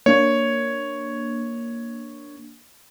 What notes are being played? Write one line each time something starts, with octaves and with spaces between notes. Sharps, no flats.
A#3 D4 C#5